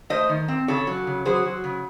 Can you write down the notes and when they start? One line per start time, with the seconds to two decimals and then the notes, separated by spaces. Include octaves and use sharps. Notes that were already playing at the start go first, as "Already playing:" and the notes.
0.10 A3 C5 D#5
0.29 D#3
0.48 C4
0.68 C#3 A4 C#5
0.87 F#3
1.07 C#3
1.25 F#3 G#4 C5
1.45 F#3
1.64 C#3